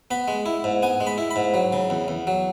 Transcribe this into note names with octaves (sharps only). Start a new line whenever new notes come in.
B3 B5
G#3
E4
G#2
B3 G#5
G#3
B5
E4
B5
G#2
F#3
C#3
E2
E2
F#3